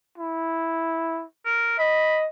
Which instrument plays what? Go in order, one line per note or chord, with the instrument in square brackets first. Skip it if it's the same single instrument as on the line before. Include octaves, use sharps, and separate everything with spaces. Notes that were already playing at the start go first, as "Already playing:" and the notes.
[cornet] E4
[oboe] A#4
[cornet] D#5 [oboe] B5